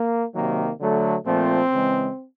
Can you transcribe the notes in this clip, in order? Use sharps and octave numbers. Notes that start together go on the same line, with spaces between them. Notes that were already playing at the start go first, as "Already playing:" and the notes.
Already playing: A#3
C3 D#3 F#3 A#3
D3 F#3 A3
A#2 F3 A3 C4
C#3 E3 G#3